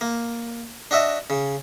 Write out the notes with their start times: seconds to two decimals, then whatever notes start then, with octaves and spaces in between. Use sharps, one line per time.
0.01 A#3
0.91 D4 F#4 D#5 E5
1.30 C#3